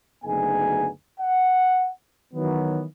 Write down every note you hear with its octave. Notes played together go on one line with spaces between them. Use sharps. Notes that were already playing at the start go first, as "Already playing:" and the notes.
F#1 D2 B3 D#4 G#4 G#5
F#5
D#3 E3 F#3 B3